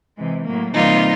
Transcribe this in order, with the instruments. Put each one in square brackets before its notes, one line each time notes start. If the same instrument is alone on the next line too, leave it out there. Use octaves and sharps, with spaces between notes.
[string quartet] C3 E3 G#3
A2 F#3 A#3
C3 E3 G3 A#3 D#4 F4